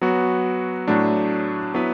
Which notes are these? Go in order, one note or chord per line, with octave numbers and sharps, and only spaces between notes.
F#3 B3 F#4
A2 F#3 A3 D4
F#3 B3 E4 B4